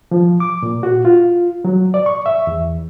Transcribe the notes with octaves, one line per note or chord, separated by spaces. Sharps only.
F3
D6
A#2
F#4
F4
F#3
D5
C#6
E5
E2